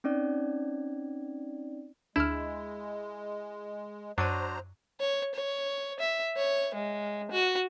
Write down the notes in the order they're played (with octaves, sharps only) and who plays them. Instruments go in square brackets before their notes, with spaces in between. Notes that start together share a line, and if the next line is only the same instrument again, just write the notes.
[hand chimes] C4 C#4 D#4 D5
[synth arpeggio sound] D2 E7 [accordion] G#3 [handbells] D4 F6 [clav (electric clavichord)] E4
[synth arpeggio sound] F#2 C#6 D#7 [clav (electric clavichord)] F#3 D4 [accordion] C5 A#5
[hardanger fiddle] C#5
C#5
E5
C#5
G#3
F#4